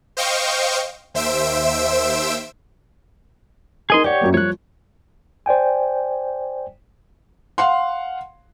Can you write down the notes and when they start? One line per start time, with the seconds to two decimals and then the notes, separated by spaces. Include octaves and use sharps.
0.17 C5 D#5 F5 G5 C#6
1.14 D#2 C5 E5 E6 D7
3.90 D#4 G#4 A#4 D#5 G#5 C6
4.04 G4 C#5 D5 F#5
4.21 F#2 F#3 A#3
4.34 F3 G3 C#5 F#6
5.46 C5 D5 G5 G#5
7.58 F5 F#5 C6